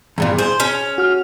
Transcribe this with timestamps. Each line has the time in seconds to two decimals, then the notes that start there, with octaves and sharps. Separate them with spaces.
0.18 E2 G2 A#2
0.39 G#4 C5
0.60 C#4
0.98 F#4 F6